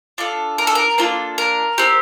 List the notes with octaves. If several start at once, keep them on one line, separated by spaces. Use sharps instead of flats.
D4 F4 A4
A#4
A4
A#4
A#3 D4 F4 A4
A#4
C4 G4